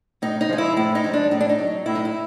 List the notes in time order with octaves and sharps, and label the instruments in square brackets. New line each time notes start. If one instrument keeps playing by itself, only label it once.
[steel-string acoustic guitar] A2 D#4
D#4
F3 G#3
E4
A2 E4
D#4
F3 G#3
D4
A2 D#4
D4
D#4
F#3
A2 E4
D#4
E4